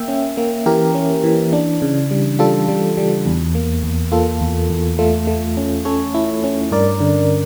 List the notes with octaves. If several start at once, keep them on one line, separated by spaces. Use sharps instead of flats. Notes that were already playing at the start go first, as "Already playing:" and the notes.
Already playing: A#3 E5 G5
C#4
A#3
E3 G4 A#4
C#4
E3
D4
C#3
G3
G3 F4 A4
G3
G3
E2
A#3
E2
A#3 F4 A4
E2
E2
A3 F4 A4
A3
C#4
C#4 A4 C#5
E4
C#4
G2 A#4 D5
D3